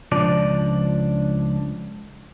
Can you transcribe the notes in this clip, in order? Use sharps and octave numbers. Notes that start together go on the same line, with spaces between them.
C#2 F3 D4 D5